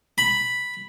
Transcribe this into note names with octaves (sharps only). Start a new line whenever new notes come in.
B5